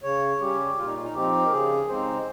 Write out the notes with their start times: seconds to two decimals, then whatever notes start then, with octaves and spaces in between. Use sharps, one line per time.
0.03 C#3 C#5
0.40 G3 C#4 G4
0.78 A#2 F4
0.86 D#4
1.03 D#4
1.14 F3 C4 D#4 G4
1.45 A#4
1.51 C#3 G#4
1.89 G#3 C4 D#4 C5